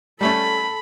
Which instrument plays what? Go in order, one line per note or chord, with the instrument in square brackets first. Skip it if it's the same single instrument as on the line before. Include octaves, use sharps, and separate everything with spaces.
[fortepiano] G3 A3 C#4 [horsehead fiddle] A4 [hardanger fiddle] B5